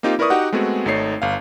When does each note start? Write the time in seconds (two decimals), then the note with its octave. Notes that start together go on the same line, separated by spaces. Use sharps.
0.03 A#3 C4 D#4 F4 G4
0.19 E4 A#4 B4 D5 C#6 D#6
0.30 D#4 F#4 G4 F#5
0.52 G#3 A3 B3 C4 F#4 G#4
0.86 G#1 A3 D#4 C#5 C7
1.22 G1 F5